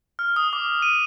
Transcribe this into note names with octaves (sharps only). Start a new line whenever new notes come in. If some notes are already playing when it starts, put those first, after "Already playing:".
F6
D#6
D6
D#7